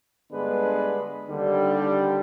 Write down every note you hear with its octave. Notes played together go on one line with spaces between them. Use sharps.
G2 D3 G#3 B3 D4 B4
D#2 D3 G3